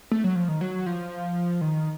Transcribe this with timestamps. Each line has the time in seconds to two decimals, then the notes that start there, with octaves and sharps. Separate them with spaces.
0.12 A3
0.24 F#3
0.36 F3
0.48 D#3
0.61 F#3
0.86 F3
1.61 D#3